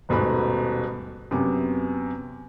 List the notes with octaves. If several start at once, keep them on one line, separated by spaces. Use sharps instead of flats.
D#1 G#2 B2 A3 B5 F#6
F#2 C3 B3 D6